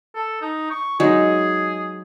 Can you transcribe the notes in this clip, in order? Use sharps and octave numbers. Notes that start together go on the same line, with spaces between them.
A4
D#4
C#6
F#3 G#3 D#4 G#4